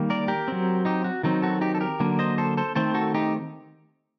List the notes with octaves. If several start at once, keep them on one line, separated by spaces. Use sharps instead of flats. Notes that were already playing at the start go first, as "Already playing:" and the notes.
Already playing: D#3 G3 A#3
A#4 D5
G4 A#4
F#3 C4
D#4 G4
F#4
D#3 F#3 C4 D#4
F#4 A4
D#4 G4
A4
G4 A#4
D3 F#3 A#3
C5 D#5
A4 C5
A4 C5
D#3 A3 C4 A4 C5
F#4 A4
D#4 G4